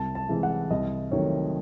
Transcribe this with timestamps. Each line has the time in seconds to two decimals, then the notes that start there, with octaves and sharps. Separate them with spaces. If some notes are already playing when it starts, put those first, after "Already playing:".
Already playing: C2 A5
0.15 A5
0.29 C3 E3 G#3
0.43 F#5
0.70 C2 D#5
1.11 C3 D#3 F#3 A3 C#5